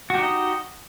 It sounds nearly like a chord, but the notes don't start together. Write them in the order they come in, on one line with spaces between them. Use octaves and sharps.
F#4 G4 D#4 D#5